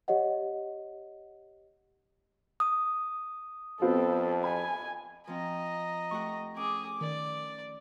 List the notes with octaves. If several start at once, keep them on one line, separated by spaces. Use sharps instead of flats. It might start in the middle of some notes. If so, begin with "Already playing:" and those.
G4 C#5 D#5 F#5
D#6
F2 B3 C4 F4 A4
G#5 B5
F3 C4 D#5 A#5
A3 G4 F#5 C#6
C#4 G#4 D6
D#3 D5